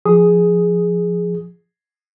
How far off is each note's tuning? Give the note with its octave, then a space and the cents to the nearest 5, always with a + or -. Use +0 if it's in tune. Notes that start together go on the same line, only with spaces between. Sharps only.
F3 +0 G#4 +0 D#6 +5